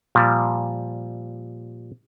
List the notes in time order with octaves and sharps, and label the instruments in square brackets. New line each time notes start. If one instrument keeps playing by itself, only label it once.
[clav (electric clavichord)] A#2 F3 G3